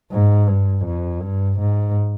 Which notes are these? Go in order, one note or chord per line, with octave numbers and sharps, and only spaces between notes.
G#2
G2
F2
G2
G#2